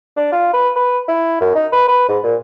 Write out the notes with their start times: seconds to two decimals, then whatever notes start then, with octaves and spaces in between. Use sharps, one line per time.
0.17 D4
0.32 F4
0.54 B4
0.76 B4
1.08 E4
1.41 F#2
1.55 D#4
1.73 B4
1.88 B4
2.09 G#2
2.24 A#2